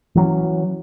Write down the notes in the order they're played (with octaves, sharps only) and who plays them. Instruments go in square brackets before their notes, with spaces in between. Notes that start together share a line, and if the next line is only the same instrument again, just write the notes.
[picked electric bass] E3 F#3 C#4